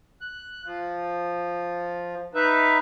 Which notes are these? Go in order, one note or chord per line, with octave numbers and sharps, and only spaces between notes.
F#6
F3
D#4 B4 E5